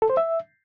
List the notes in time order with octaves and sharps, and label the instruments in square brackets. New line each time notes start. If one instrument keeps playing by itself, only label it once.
[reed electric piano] A4
C5
E5